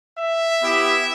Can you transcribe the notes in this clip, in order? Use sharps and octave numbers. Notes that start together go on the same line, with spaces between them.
E5
B3 E4 G4